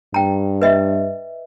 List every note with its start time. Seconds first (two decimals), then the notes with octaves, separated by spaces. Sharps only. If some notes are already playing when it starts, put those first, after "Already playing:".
0.14 G2 G5 A#5
0.62 B4 D#5 E5